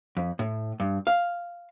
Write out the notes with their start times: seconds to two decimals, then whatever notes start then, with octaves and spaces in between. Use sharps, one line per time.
0.17 F2
0.39 A2
0.80 G2
1.07 F5